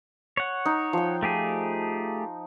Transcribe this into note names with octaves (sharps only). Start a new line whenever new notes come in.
C#5 F#5
D#4
F3 G5
A3 G4 G#4